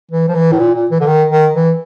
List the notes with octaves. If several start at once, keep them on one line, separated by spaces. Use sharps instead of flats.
E3
F3
E3
A2
A#2
A#2
E3
D3
D#3
D#3
E3